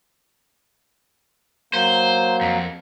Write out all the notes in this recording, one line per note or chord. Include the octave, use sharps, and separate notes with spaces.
F#3 A#3 C5
F2